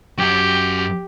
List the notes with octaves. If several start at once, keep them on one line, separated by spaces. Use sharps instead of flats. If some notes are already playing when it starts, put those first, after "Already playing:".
F#2 F#4 G4